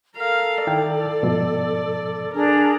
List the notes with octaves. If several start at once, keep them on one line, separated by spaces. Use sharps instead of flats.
A4 A#4 F5
D#3 E4 D5 G5
G#2 B2 F3
D4 G#4 A#4 A#5